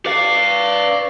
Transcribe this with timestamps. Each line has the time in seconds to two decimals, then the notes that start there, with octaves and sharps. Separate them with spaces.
0.06 B4 D5 F5